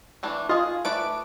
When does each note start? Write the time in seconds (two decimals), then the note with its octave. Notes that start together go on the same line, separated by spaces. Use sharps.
0.23 E3 A3 D4
0.49 F4 G#4 D#5
0.85 A3 B4 D5 D7